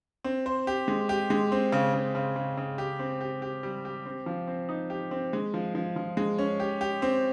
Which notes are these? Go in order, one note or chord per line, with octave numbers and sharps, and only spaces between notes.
C4
C5
G4
G#3
G4
G#3
C4
C#3
C#3
C#3
C#3
C#3
G4
C4
G4
G4
G3
G4
C4
F3
C4
D#4
G4
C4
G#3
F3
F3
F3
G#3
C#4
G4
G4
C4